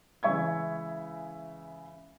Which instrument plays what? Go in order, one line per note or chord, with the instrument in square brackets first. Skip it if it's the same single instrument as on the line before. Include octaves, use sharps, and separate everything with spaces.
[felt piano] C#3 E3 G#3 E5 C#6 G#6